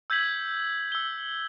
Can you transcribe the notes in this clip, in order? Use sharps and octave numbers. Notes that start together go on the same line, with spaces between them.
E6 G6 G#6 B6 F#7
E6 G7